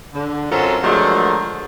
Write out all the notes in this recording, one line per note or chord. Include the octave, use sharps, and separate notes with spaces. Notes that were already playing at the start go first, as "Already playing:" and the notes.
D3
F#2 F#3 C4 F4 A4 A#5
D3 F3 F#3 G#3 A3 A#4